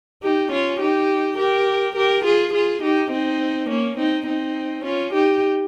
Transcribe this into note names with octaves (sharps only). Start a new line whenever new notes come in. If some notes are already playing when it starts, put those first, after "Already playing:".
D#4 G4
C#4 F4
D#4 G4
G4 A#4
G4 A#4
F4 G#4
F4 G#4
D#4 G4
C4 D#4
A#3 C#4
C4 D#4
C4 D#4
C#4 F4
D#4 G4